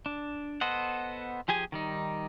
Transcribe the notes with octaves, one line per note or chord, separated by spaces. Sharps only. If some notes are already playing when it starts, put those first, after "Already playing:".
D4
B3 A4 C5 D#5 F#5
F3 G4 G#4 G#5
D#3 G3 D#4